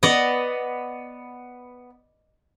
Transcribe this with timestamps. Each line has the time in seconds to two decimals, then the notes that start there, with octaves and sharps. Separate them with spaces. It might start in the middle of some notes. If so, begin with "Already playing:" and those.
0.03 B3 D5 D#5